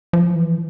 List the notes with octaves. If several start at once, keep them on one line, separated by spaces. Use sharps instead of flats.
F3
E3